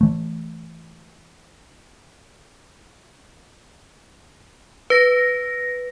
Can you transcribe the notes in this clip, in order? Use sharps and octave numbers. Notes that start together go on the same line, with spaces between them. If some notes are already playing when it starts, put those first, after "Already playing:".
E3 A3
B4 A#6